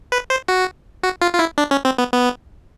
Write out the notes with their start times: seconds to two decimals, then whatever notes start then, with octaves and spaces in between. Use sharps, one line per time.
0.12 B4
0.30 C5
0.48 F#4
1.03 F#4
1.21 F4
1.33 F4
1.39 E4
1.58 D4
1.71 C#4
1.85 C4
1.98 B3
2.12 B3